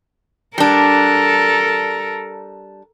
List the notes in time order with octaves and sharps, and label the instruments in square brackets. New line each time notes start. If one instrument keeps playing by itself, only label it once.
[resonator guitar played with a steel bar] G3 D4 [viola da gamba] A4 A#4